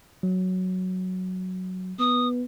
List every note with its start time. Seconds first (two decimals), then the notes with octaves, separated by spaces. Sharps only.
0.23 F#3
1.99 B3 D#6